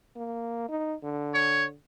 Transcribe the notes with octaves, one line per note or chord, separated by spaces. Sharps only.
A#3
D#4
D3
C#5